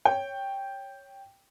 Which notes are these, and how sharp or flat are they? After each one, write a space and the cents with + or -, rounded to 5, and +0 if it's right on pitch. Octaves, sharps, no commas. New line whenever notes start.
C#5 +0 G5 +0